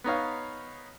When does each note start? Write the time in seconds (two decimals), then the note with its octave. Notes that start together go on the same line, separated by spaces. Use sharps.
0.04 B3 D#4 C#5 F5